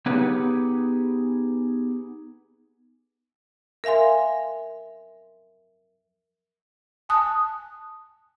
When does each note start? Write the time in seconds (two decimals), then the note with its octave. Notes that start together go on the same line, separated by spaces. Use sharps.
0.06 B3 D#4 G4 G#4 B4 C#5
3.84 A#4 E5 F5 G#5 C6
7.09 G#5 A5 D#6 F#6